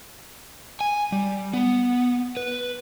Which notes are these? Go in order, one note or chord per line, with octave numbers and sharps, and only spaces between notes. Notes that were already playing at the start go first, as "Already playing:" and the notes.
G#5
G3
B3
B4